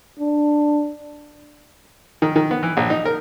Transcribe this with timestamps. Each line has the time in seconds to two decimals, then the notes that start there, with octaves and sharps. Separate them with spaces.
0.19 D4
2.22 D#3
2.36 D#3
2.51 B3
2.63 E3
2.77 A#1
2.90 D#4
3.05 A#4